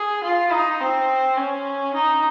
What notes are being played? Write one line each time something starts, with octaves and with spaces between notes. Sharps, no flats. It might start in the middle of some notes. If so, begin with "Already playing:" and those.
Already playing: G#4
F4
D#4
C4
C#4
D#4